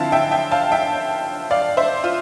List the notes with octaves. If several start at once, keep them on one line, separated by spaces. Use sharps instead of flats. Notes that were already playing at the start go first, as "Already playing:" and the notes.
Already playing: D3 F3 C4 E4 F5 A5
E5 G5
E5 G5
F5 A5
E5 G5
D5 F5
C5 E5
F4